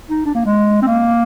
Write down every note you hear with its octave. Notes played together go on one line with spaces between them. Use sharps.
D#4
D4
A#3
G#3
C4
A#3